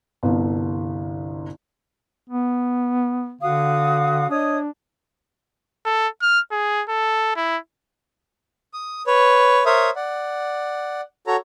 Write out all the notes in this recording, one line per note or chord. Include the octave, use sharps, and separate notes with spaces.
G1 C2 D3
B3
D3 F#4 F5 D#6
D4 C#5 D#5 D#6
A4
F6
G#4
A4
E4
D#6
B4 C#5
A#4 C5 C#5 E5 D#6
D5 F#5
F#4 A4 C#5 A#5